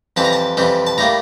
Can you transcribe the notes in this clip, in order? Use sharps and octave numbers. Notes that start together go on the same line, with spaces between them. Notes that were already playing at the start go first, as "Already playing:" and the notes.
F2 E3 G3 C4 A5
A#5
A5
F2 E3 G3 C4
A5
A2 G3 A#3 A#5